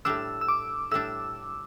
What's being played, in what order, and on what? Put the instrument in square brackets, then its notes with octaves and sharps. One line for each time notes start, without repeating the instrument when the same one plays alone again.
[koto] A2 G3 D4 [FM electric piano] E6
[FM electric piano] E6
D6
[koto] A2 G3 D4 [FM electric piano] E6